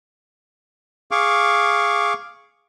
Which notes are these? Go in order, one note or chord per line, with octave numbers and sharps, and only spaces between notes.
G#4 F5 C#6 D6